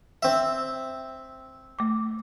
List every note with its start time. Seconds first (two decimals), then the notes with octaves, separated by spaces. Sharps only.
0.23 C4 E5
1.79 A3 D6